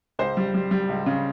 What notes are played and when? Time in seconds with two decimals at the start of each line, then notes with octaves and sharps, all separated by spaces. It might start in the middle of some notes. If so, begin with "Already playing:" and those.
0.19 C#2 C5
0.37 G3
0.54 G3
0.71 G3
0.89 C#2
1.06 C#3